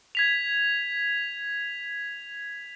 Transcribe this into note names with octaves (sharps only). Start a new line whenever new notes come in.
G#6 B6 F7